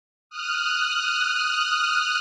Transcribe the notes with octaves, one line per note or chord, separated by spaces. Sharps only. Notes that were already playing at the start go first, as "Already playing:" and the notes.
D#6 F6 F#6